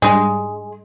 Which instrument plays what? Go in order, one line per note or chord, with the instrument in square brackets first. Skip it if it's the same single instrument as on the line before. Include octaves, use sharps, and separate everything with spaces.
[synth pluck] G#2 G3 D4 [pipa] G#3